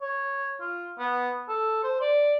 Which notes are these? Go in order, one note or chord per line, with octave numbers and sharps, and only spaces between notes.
C#5
F4
B3
A4
C5
D5